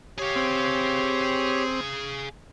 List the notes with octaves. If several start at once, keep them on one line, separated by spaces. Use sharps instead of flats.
G4 G#4 C#5 F5
C4